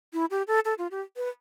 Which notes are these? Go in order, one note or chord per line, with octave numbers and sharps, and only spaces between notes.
E4
G4
A4
A4
F4
G4
B4